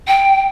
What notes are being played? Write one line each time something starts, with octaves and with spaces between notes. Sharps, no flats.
G5